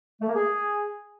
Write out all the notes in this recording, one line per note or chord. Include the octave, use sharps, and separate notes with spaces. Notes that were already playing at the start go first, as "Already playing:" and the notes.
A3
A#3
G#4